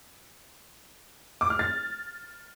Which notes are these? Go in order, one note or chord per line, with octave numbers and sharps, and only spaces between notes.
D6
F6
A6